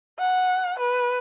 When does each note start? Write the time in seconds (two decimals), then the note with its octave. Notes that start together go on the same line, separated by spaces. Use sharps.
0.19 F#5
0.79 B4